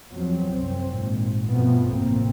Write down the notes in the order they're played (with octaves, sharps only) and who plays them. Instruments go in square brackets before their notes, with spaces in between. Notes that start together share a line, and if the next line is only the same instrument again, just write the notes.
[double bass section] E2 F3 F#3 C4
C2 F#2 C4
G#1 A#2
G2 B2 F3 A3 B3 C4
A1 F2 A2 C3 A#3 C4